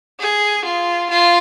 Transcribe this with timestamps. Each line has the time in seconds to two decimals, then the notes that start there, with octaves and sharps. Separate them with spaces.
0.20 G#4
0.65 F4
1.10 F4